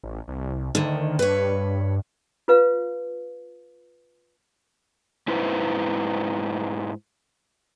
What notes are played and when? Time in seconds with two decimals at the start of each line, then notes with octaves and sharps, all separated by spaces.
0.04 A1
0.28 C2
0.75 D2 D3 D#3
1.19 G2 B4 C#5
2.48 F4 B4 F5
5.28 G#2 E4 B4 C5